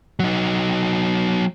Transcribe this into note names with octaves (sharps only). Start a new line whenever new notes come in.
F#3 D#4